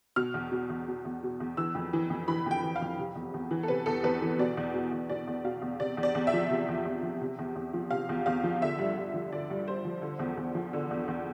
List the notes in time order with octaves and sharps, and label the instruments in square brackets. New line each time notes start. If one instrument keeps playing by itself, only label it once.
[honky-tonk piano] B2 F6
E2
B2
E2
B2
E2
B2
E2
E3 E6
F2
E3
F2
E3 B5
F2 G5
E3
F5
F2
C3
E2
E2
E3
A4
C3 B4
E2 A4
E2 B4
E3
B2 D5
E2
B2
E2
B2 D5
E2
B2 F5
E2
C3 D5
E2
D5
E2
E5
F3
C3
E2
E2
F3
C3
E2
E2
F3
C3 F5
E2
E2 F5
F3
D3 E5
G2
G2
F3
D3 D5
G2
G2 C5
F3
D3
E2
E2
F3
D3
E2
E2